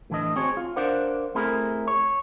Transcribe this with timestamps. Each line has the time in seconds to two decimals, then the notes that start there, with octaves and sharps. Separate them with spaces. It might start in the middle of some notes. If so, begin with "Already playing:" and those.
0.10 A2 E3 D4 D#5
0.36 C4 F#4 G#4 C#5
0.57 F4
0.76 D4 A#4 C5 D5 F5 F#5
1.35 A3 C4 E4 G#4 A#4
1.88 C#5